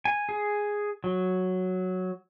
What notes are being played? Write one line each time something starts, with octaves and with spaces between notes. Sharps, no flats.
G#5
G#4
F#3